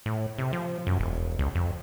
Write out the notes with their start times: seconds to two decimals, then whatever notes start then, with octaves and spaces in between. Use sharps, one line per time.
0.06 A2
0.38 C3
0.53 F3
0.87 F#2
0.99 E1
1.39 C#2
1.55 F2